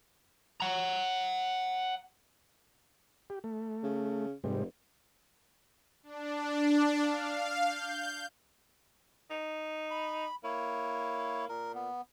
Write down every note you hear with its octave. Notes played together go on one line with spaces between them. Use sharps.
F#5 A#5
G4
A3
C#3
F1 G#2 C3 G3
D4
F5
G6
D#4
B5
A#3 E4 C#5
A#2 A#4
B3